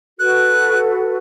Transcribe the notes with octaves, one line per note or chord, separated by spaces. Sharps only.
F#4 A4 B4 F#6